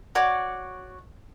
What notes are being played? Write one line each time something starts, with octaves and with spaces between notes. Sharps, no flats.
F#4 C#5 D5 D6